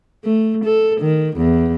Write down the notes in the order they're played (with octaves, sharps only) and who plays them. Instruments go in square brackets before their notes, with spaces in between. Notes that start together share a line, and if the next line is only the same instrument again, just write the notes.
[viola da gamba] A3
A4
D#3
E2